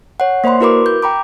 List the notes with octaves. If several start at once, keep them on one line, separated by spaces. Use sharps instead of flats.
C#5 F#5
A#3 C5 D5 B5 C6
E4 F#4 A#4 B4 B5 D6
G6
G5 A#5 B5 D6